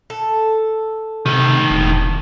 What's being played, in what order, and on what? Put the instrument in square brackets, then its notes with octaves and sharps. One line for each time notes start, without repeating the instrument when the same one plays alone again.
[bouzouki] A4
[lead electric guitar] A2 D#3 [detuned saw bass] C3
[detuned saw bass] E1